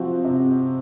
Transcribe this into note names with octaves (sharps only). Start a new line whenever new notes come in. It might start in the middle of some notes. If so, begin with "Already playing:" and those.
Already playing: C3 F3 C4 F#4
C3